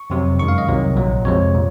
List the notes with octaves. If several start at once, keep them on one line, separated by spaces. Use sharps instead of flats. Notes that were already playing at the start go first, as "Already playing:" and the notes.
Already playing: C#6
F2 C3 F#3
F#2 D#3 G#3 C#6
F5
D#5
C2 C3 D#3 F#3
A#1 A#2 F#3
F2 C3 F3 G#3 C#5
A#2